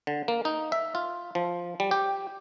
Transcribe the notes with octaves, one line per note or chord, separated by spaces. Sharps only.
D3
A#3
D#4
E5
F4
F3
G3
G4